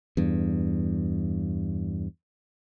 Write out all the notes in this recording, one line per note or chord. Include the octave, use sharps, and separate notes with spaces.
E2 G2